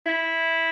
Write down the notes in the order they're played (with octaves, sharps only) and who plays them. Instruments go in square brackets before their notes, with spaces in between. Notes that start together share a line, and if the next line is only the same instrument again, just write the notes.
[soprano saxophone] E4